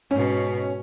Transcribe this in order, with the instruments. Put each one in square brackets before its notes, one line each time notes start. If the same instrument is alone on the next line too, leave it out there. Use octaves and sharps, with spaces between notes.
[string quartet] G#2 B2 [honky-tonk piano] C#4